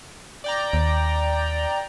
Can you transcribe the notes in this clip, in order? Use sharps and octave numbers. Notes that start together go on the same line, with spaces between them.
D5 G5 A#5
D#2